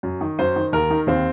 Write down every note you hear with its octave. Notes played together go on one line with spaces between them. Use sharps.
F#2
D#3
F#2 C5
D#3
D#2 A#4
D#3
D#2 C4